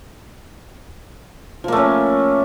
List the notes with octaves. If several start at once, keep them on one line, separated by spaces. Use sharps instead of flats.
F3 A3 A#3 C#4